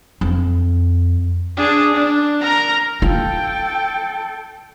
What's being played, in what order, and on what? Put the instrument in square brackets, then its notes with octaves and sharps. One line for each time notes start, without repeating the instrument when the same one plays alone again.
[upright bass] F2
[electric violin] D4 G#4
D4
A#4 A#5
[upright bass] F4 [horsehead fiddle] A4 G5